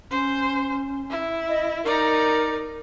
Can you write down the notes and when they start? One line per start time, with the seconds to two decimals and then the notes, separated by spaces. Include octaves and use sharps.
0.11 C#4 C5
1.10 E4
1.49 D#5
1.85 D#4 A#4 D5